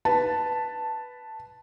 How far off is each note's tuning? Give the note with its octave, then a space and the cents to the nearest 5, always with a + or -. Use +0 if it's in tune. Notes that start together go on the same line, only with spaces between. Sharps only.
B4 +0 A5 +0